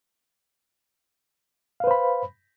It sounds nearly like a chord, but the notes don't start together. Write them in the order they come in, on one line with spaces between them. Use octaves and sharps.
F5 B4 C5 B5